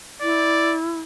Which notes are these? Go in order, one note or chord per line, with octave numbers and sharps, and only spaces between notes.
E4 D5